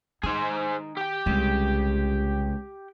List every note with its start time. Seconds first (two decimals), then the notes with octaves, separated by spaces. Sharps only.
0.23 D#3 D#4 G#4 C5 G#5
0.97 G4 G5
1.26 C2 C#3 G#3